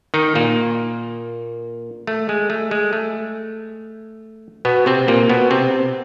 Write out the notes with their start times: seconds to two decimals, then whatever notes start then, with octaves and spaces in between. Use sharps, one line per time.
0.14 D#3 D#4
0.35 A#2 A#3
2.07 A3
2.29 G#3
2.50 A3
2.71 G#3
2.93 A3
4.65 B2 B3
4.86 C3 C4
5.08 A#2 A#3
5.29 B2 B3
5.51 C3 C4